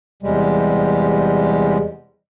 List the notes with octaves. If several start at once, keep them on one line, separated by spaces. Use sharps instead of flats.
E2 C3 G3 G#3